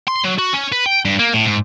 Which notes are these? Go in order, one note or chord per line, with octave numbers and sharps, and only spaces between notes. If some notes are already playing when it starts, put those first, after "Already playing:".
C6
F#3
F#4
C#4
B4
G5
G2
A#3
A2
G#2